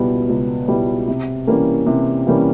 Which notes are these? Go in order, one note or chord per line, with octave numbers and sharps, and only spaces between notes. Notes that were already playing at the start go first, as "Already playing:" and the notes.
Already playing: C#2 B2 G3 B3 E4
C#2
B2 G3 B3 E4
C3
E3 G3 A#3 C#4
C3
E3 G3 A#3 C#4